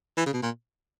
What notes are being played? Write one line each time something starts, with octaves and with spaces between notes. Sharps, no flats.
E3
C#3
B2
A#2